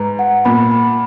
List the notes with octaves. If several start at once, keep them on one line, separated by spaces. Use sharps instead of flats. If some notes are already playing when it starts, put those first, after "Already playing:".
Already playing: G#2 B4 A#5
F#5
A#2 B5
B5